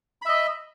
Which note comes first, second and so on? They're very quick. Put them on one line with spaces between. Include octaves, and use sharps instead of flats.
B5 E5 D#5